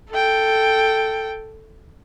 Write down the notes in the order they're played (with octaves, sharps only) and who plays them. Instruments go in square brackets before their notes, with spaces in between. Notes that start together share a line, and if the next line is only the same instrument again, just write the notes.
[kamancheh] A4 G5